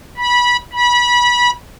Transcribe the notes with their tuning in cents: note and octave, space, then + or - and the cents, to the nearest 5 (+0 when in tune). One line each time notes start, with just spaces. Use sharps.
B5 -20
B5 -25